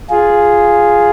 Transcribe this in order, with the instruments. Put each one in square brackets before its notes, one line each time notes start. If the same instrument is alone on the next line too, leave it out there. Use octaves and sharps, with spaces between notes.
[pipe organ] F4 G#4